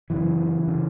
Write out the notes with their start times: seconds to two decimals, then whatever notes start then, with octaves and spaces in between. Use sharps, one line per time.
0.10 F#2 C#3 E3
0.68 C#3